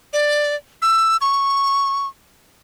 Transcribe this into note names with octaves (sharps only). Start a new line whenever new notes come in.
D5
E6
C#6